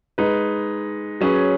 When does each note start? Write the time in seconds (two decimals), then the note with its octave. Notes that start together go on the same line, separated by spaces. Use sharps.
0.18 G#3 D#4 B4
1.21 F#3 C#4 G#4 B4